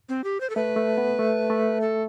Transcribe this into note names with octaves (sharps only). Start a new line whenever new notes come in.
C4
G4
C5
A4
A3 B4
A3
B3
A3
A3
A4